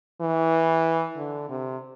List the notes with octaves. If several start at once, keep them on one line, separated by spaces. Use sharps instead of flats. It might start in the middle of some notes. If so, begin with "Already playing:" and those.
E3
D3
C3